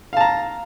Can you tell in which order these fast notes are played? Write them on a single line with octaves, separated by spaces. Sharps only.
F5 A5 A#5